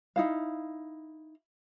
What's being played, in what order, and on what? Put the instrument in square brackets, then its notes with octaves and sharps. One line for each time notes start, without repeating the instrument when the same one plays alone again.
[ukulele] D#4 E4 F5